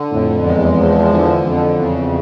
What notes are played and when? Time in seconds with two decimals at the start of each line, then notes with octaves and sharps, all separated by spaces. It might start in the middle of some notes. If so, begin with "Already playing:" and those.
Already playing: D3
0.12 F2 A2
0.45 E2 G#3
0.79 F3
1.13 D3
1.46 F2
1.79 E2 C#3